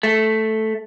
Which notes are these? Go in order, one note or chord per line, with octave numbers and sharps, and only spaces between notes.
A3